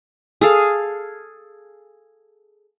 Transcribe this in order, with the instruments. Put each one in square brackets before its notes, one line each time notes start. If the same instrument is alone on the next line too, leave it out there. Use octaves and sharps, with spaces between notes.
[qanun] G#4 A4 F5